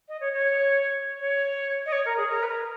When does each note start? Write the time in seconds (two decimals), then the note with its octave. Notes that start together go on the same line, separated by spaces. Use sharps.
0.08 D#5
0.21 C#5
0.33 C#5
1.19 C#5
1.86 D#5
1.92 C#5
2.05 A#4
2.17 G#4
2.29 A#4
2.43 B4
2.47 A#4